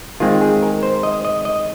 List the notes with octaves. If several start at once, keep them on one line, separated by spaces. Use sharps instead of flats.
D#3 G#3 C4 F4
G#4
A#4
C5
D#5
D#5
D#5